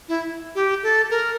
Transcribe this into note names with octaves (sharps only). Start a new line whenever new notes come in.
E4
G4
A4
A#4